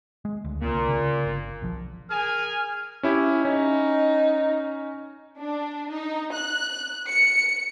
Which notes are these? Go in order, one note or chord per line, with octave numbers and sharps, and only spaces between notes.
G#3
D2
C2 A#2 A#3
C#3
G1
B1 F3
G#4 A#4 G#5 F6
C#4 E4 G4
C#4 D#4
D4
D#4
F#6
C#7